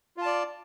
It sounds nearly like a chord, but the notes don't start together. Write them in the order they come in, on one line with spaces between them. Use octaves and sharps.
F4 A5 D5